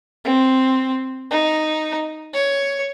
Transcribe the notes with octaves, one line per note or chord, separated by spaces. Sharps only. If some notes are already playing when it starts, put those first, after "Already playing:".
C4
D#4
C#5